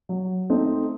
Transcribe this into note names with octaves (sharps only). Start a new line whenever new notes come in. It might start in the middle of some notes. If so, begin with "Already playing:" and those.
F#3
A3 C4 D#4